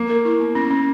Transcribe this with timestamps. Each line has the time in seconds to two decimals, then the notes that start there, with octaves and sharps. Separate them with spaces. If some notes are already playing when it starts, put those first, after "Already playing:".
Already playing: A#3
0.10 A#4
0.25 E4
0.40 B3
0.55 C#4
0.70 C#4